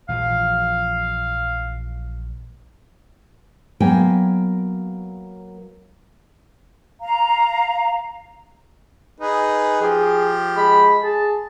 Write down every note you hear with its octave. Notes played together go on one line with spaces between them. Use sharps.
A#1 E3 F3 F5
F#3 A#3 B3 G5 G#5
F5 A#5
D#4 G#4 B4
F3 G4 G#4
G#3 B5
G#4 A5